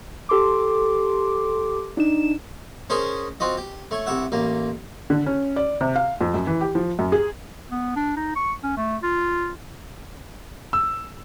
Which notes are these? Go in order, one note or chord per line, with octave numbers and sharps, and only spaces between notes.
G4 A4 C6 D6
D4 D#4 E7
C#4 G#4 A#4 C5 C#5 D#5
C4 F4 F#4 D#5
G4
A3 C#5
C2 C#5 E5 F#5
A1 A#3
D3
C#4
D5
C3
F5
F2
F#2
E3
G4
F3
F#2
G#4
B3
D4
D#4
C#6
C#4
A3
F4
E6